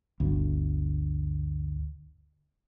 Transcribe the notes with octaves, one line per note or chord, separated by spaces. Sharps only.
G1 D2